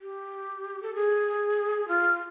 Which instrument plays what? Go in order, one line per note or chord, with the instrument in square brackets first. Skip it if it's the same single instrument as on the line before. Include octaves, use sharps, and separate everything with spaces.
[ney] G4
A4
G#4
F4